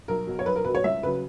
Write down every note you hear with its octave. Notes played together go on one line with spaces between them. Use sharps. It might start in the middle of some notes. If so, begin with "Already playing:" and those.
B1 A#4
B2 F#3
C#5
B1 B4
A#4
B2 F#3 B4
C#5
C#2 E5
C#3 F#3 B4